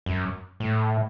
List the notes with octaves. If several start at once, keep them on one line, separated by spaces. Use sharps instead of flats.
F#2
A2